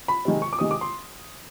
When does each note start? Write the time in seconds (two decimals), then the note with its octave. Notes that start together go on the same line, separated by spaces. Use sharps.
0.08 B5
0.25 C3 D#3 G#3
0.42 C#6
0.53 D6
0.59 C3 D#3 G#3 D#6
0.71 D6
0.81 C6